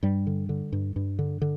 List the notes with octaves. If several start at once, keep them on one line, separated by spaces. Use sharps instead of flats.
G2 G3
D3
D3
G2
G2
D3
D3